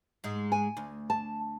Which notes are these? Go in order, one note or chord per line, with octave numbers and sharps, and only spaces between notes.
G#2 G#3
G#5
D2
A5